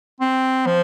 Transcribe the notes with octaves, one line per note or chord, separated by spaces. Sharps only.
C4
F3